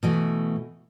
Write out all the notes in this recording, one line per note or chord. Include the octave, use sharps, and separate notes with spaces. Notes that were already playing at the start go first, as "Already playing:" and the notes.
B2 E3 A3